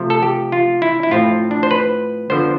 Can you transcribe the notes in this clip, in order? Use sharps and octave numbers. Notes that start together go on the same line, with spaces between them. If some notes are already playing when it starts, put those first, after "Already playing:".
Already playing: C3 F3 A3
A4
G4
F4
E4
E4
A2 F3 C4 F4
D4
C5
B4
D3 F3 B3 C5